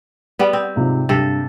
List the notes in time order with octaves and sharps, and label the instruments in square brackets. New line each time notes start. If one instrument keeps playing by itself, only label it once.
[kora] G3 B3
C4
[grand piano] G#2 C3 F4
[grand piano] G2 [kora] C3 A4